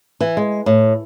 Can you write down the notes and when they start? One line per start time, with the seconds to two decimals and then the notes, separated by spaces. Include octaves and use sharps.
0.21 E3
0.37 G#3
0.66 A2